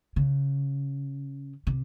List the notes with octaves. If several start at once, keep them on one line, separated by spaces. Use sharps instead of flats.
C#3
C3